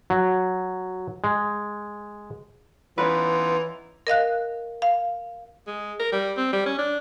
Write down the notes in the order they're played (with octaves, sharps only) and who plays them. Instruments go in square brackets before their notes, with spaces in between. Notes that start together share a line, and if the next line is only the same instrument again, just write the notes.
[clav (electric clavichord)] F#3
G#3
[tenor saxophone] E3 [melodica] B3 D#4 F4 [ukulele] C#4 B4
[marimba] A#4 D#5 F5 F#6
F5
[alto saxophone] G#3
A#4
G3
C4
G3
C#4
D4